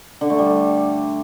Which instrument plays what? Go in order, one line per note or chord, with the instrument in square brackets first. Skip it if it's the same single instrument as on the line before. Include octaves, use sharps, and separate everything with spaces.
[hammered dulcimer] D3
A3
G3